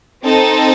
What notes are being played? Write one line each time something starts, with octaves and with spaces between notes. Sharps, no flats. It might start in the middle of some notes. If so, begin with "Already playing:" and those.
C4 D#4 A4